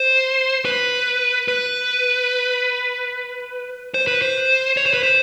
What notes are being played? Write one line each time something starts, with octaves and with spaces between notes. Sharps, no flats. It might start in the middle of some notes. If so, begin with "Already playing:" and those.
Already playing: C5
B4
B4
C5
B4
C5
C#5
C5
B4
C5